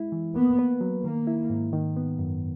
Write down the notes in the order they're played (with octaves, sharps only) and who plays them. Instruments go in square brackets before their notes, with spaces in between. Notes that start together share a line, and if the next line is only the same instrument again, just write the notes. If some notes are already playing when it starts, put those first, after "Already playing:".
Already playing: [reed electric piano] G#3 E4
E3
[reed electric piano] A#3 [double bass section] B3
[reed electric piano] B4
F#3
[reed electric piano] D#3 [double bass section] A#3
[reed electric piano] E4
G#2
D#3
B3
F#2